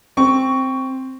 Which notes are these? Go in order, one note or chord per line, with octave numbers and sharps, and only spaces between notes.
C4 C#6